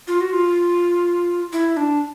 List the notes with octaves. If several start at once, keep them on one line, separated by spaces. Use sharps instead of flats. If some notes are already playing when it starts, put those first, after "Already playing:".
F4
F#4
F4
E4
D4